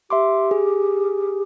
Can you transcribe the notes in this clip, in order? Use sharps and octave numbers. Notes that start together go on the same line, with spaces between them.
G4 E5 C6 D6
G#4